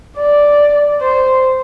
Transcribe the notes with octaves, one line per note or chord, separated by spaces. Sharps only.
D5
C5